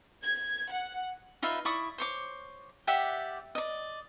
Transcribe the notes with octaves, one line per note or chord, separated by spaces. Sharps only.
G#6
F#5
D#4 F4 B4 E5
E4 D5 C#6 D#6
C5 C#5 D6
G4 D5 E5 F#5
D5 D#5